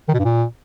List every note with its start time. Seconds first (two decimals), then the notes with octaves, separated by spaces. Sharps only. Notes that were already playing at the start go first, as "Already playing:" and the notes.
0.08 D#3
0.14 B2
0.19 G2
0.24 A#2